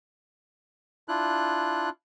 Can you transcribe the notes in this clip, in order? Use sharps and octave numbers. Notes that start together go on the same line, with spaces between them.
D4 E4 F4 F#6